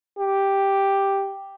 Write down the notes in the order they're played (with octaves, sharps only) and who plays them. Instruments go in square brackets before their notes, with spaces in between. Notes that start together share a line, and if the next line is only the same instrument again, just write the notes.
[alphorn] G4